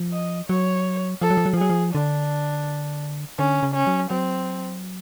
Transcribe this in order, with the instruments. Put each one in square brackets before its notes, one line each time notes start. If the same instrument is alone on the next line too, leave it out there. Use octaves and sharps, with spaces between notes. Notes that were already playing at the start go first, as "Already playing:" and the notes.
Already playing: [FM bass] F3
[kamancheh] D#5
[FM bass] F#3 [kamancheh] C#5
[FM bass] F3 [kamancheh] A4
[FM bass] F#3
F3
F#3
F3
[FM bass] F#3 [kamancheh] G#4
[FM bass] F3
[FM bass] D3 [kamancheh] D4
[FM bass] D3 [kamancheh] C#4
[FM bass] C#3
[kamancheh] C#4
[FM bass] F#3
[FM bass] F#3 [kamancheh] C4